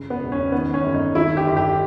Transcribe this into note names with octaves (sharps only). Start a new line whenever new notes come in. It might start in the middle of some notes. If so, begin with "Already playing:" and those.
Already playing: G1 C#3
B3
E1
C#4
D#3 B3
C#4
G1
D#4
D#3 E4
G4
G1
G4